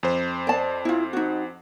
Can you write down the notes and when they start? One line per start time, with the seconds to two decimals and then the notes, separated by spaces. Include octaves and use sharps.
0.03 F2 C5
0.47 D5 A5
0.85 E4 F4
1.13 D#4 F#4